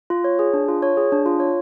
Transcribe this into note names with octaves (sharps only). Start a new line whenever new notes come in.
F4
C#5
G#4
D4
F4
C#5
G#4
D4
F4
C#5